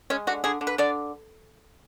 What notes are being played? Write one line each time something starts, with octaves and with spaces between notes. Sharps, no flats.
G#3 C#4
D3 F#4
D3 G#4
D3
B4
D3 D5